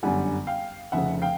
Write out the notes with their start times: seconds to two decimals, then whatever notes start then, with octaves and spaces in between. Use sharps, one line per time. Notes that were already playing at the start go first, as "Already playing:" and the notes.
0.03 G1 F#2 D3 G3 F#5 G#5
0.47 F5 G5
0.92 F1 F2 C#3 E5 F#5
1.22 F5 G5